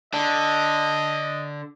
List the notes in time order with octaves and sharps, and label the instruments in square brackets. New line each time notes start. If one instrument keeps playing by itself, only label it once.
[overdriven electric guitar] D3 [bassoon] D4 [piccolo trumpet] D#5